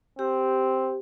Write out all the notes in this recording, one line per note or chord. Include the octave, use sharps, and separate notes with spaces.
C4 G4